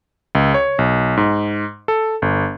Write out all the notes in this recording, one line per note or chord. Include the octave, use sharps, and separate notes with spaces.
C#2
C#5
B1
G#2
A4
G1